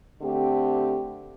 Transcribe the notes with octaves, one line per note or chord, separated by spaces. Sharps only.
D3 A3 C4 G4